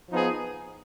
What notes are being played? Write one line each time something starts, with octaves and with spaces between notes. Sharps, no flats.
F3 B3 D#4 G#4